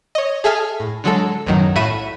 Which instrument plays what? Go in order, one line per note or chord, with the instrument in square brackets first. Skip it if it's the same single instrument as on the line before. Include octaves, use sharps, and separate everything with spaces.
[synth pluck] C#5 D#5
G#4 A4 E5 G#5 F6
A2
D3 F#3 G#3 A4
B1 F#2 A2 D#3 F#3
A2 F#4 E5 B5 D#7